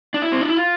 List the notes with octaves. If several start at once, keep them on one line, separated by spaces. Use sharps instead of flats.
D4
E4
C4
D4
E4
F4